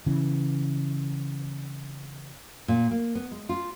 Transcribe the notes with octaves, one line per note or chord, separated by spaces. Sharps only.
C#3 E3 B3
A#2
A#3
B3
G#3
F4